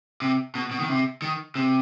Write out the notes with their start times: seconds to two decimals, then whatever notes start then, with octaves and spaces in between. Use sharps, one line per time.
0.22 C3
0.55 B2
0.71 B2
0.80 D#3
0.89 C3
1.22 D#3
1.55 C3